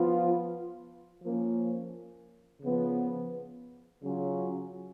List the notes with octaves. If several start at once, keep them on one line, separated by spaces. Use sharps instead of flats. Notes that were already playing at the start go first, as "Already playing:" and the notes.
Already playing: F3 B3 F4
F3 A#3 C#4
C#3 F3 B3
C#3 F#3 C#4 F4